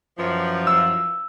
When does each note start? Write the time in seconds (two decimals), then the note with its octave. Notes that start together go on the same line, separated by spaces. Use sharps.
0.18 F#2 E3 F3
0.67 E6